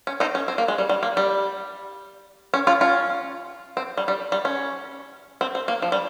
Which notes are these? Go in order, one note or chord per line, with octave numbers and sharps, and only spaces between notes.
C#4
C4 D#4
C#4
C4
A#3
G#3
G3
G3
A#3
G3
C#4
C#4 F4
C#4 F4
C4
G3
G3
G3
C#4
C4
C4
A#3
F3
G3